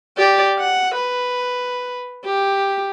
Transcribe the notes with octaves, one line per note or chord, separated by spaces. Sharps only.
G4 D5
F#5
B4
G4